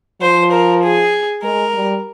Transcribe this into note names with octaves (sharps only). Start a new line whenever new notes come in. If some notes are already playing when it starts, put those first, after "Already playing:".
F3 C5
A#4
G#4
G#3 A#4
G3